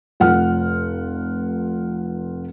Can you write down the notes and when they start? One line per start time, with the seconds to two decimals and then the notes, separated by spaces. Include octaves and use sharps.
0.20 F1 F4 F#5 F6